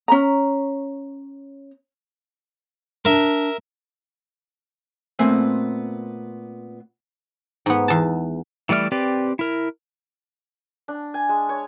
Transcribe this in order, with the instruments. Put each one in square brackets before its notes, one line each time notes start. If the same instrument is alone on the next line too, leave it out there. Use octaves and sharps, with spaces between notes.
[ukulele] C#4 A#5
[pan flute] D4 [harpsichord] A#4 E5
[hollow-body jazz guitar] A#2 A3 B3 C4 G#5
[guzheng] G#2 B3
E2 A5
[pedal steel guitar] E3 G3 A3 D5 F6
C4 G4 B4 D5
E4 A#4
[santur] D4
G#5
G#3
C#5